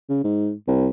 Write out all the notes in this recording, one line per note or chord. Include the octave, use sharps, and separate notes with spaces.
C#3
G#2
C2